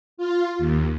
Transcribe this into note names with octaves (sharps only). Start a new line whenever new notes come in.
F4
D#2